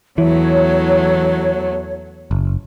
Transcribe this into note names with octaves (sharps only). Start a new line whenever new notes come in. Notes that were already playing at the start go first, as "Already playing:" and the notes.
E2 E3 F#3 A3 C#5
F#1